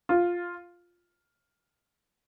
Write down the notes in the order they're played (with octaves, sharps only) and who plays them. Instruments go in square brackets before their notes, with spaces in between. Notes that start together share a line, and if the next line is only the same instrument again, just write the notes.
[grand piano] F4